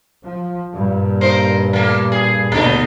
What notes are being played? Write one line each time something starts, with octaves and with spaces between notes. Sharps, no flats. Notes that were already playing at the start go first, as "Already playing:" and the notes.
F3
G2 A#2
D#4 A#4 C5
A3 A#3
G#4
D#2 B2 D3 A3 D4 D#4